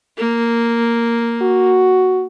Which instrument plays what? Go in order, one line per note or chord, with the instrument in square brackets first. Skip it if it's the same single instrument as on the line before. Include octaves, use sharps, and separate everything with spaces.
[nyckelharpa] A#3
[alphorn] F#4